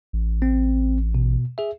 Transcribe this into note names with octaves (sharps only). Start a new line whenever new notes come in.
A1
C4
B2
G#4 E5